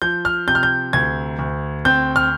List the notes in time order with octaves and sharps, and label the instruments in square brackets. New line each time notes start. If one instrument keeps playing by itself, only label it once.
[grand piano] F3 G6
F6
C3 G6
F6
G6
D2 G#6
D2
C4 G6
F6